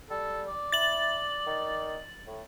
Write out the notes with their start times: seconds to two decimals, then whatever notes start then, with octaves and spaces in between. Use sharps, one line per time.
0.10 G3 A4
0.48 D5
0.72 E4 A6 F#7
1.47 D#3
2.27 A2